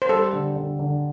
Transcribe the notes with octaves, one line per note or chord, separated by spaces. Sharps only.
C5
G3 A4
D3
D3
D3